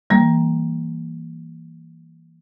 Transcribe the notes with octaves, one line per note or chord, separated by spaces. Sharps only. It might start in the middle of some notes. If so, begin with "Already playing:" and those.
E3 G3 A#3